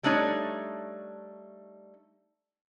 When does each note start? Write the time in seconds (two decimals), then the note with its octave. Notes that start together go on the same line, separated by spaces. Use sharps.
0.03 G3 A3 D4 D#4 C#5